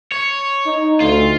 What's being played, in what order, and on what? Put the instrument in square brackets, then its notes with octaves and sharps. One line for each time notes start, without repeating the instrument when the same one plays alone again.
[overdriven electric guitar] C#5
[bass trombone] D#4
[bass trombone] D2 [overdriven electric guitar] F4